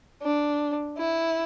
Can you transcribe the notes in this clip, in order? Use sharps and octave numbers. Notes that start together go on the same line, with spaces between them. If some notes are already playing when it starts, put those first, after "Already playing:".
D4
E4